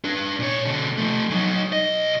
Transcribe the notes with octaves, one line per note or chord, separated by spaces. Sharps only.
D4 B4
A#2 C#5
B2 D3
F3 A3
F#3 D#4
B1 D#5